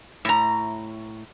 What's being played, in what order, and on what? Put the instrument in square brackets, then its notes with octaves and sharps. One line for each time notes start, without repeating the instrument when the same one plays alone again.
[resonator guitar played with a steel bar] A2 A#5